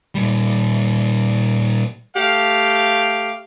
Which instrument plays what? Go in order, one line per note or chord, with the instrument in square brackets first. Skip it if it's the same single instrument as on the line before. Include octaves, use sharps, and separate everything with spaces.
[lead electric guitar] A#2 G3
[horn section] A3 G4 F5